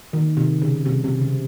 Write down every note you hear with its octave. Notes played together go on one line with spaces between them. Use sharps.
D#3
C3
C#3
C3
C3
C#3